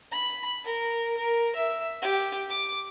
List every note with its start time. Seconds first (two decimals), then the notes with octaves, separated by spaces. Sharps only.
0.12 B5
0.64 A#4
1.17 A#4
1.56 E5
2.02 G4
2.49 D6